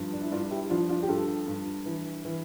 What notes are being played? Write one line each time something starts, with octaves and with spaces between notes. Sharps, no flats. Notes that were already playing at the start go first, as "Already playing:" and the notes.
Already playing: G2 F3
D4
E4
G2 D4 F4
E4 G4
F3 D4 F4
D4 F4
G4
G2 F4 A4
G2
E3
E3